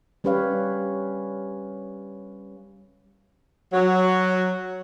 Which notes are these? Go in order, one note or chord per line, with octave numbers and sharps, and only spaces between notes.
G3 C#4 G4 B4 C#5 F5
F#3